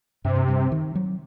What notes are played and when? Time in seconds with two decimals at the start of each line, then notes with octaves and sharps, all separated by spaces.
0.25 G2 C3
0.48 G2
0.72 D#3
0.95 F#3